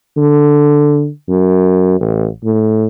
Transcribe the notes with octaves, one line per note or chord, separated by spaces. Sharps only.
D3
F#2
A1
A2